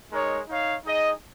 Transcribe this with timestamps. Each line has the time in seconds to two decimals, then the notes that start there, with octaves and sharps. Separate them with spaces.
0.12 G#3 D#4 A#4 C#5
0.48 D#4 C#5 F5
0.84 D#4 G#4 D#5